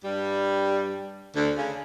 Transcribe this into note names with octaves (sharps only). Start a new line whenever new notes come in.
G2 G3
D2 D3
C#3